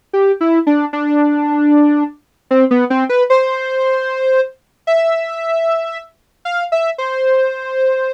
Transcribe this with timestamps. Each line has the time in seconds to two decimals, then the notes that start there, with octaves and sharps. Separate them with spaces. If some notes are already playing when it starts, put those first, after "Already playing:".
0.13 G4
0.41 E4
0.67 D4
0.93 D4
2.51 C4
2.71 B3
2.90 C4
3.09 B4
3.30 C5
4.87 E5
6.45 F5
6.72 E5
6.98 C5